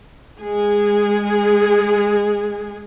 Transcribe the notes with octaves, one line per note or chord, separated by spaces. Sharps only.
G#3 G#4